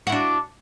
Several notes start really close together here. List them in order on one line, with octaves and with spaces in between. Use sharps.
F#4 E4 D4